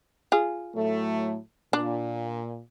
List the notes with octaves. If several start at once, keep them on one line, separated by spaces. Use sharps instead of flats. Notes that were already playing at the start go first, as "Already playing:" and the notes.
F4 G#4
A2 F#3 A3
A#2 D4